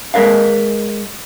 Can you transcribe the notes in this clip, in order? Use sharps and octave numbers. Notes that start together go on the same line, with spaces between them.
G#3 A#4 B4 F5